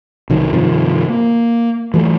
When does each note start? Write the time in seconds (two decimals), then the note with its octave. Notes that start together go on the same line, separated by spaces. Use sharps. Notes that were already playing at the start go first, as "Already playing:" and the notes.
0.30 C2 D#3 F#3
0.53 G2 C3 D#3 F3
1.09 A#3
1.94 E3 F#3 A3